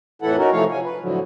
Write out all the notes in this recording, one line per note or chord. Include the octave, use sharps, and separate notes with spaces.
F2 A2 E3 E4 A4 F#5
C#4 D#4 F#4 A#4
C3 E3 F3 A3 C#5 F5
C3 F3 C#4 G#5
B4
A2 D3 F3 F#3